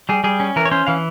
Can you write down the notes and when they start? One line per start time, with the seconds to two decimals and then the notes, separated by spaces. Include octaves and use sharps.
0.09 G3 G#4
0.24 G3 G#4
0.40 C#4
0.56 E3 A#4
0.65 C#5
0.71 C#4 C5
0.87 E3 F5